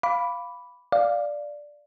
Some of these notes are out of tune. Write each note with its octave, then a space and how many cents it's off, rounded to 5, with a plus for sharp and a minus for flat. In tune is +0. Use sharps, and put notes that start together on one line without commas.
F5 +0 B5 +0 D6 -15
D5 +0 F5 +0